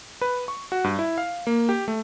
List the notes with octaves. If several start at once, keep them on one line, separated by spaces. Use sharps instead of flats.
B4
C#6
F#4
G2
E4
F5
A#3
G4
A3